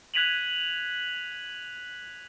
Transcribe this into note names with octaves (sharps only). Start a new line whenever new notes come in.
F#6 G#6 B6 D#7 F7 F#7